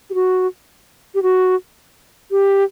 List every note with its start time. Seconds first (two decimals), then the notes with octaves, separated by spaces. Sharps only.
0.10 G4
0.14 F#4
1.15 G4
1.23 F#4
2.31 G4